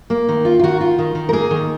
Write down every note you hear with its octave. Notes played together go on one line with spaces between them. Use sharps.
A#3
D#3
F4
F4
D#3 F#4
F4
D#3
D#3
A#4
A#3 G#4
D#3